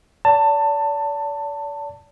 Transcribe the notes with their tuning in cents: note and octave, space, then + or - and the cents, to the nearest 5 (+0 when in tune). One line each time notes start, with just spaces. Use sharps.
D5 -40 A5 +20